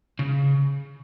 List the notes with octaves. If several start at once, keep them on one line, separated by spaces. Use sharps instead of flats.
C#3